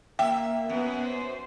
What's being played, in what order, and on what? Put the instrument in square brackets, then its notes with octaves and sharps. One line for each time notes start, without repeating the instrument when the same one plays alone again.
[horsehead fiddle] A#3 [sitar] E5 [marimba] G5
[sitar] F#2 [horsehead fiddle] B3 B4
[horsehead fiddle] C5